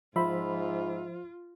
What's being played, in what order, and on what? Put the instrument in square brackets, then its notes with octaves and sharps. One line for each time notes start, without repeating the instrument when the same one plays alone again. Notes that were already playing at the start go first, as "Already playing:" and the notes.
[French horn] G#2 [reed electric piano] F3 C5 [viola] F4 [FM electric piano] E5 B5